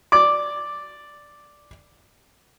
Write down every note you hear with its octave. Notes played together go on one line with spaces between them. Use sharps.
D5 D6